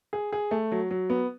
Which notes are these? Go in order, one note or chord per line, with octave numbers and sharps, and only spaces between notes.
G#4
G#4
A3
F#3
F#3
B3